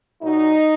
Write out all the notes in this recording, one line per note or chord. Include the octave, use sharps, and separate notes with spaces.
A#2 F#3 D#4